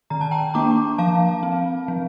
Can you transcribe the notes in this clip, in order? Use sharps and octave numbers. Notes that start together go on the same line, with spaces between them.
D#3 A#5
A5
G5 A#5
A#3 D4 A#5 D6
F3 F5 A5
C4
F3